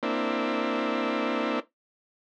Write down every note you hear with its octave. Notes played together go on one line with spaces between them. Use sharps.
A#3 C4 D4 E4